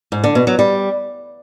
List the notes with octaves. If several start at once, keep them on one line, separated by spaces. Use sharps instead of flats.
G#2
D3
B2
F#3
G3